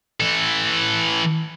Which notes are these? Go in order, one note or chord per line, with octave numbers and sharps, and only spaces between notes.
E3 A4